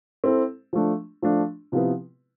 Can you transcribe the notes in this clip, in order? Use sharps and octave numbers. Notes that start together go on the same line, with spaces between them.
C4 E4 A4
F3 A3 D4
F3 A3 D4
C3 F3 B3 E4 B4